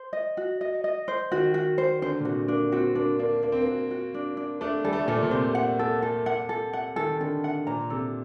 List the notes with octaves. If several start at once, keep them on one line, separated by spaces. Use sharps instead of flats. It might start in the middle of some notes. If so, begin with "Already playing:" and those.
Already playing: C5
D#5
F#4
D#5
D#5
C5
D#3 F#4
F#4
C5
D3 C5
A#2
C3 F#4
A#3 D4
C4 F#4
A#3 D4
A#3 D4
A#3 D4
C4
A#3 F#4
F#4
D4
D4
A3 D4
G3 A4
A3
G3
A#2 A4
A#2
C3 C5
F#5
A4
A4
F#5
A4
F#5
D#3 A4
D3 A4
F#5
A#2 A#5
C3 A4